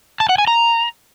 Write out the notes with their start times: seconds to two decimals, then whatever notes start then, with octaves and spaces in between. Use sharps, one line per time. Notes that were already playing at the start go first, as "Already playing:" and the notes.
0.20 A5
0.29 F#5
0.38 G#5
0.47 A#5